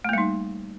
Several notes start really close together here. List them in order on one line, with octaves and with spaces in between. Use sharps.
A3 A#3 G3 D#4